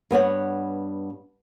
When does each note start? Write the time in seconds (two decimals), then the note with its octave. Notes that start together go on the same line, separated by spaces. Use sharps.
0.11 G2 B3 C#5 F#5